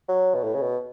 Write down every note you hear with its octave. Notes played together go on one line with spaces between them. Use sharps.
F#3
B2
A2
C#3
B2